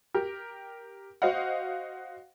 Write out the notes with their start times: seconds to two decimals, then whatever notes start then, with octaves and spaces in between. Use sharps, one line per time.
0.14 G4 A#4
1.22 F#4 C5 D#5 F5 F#5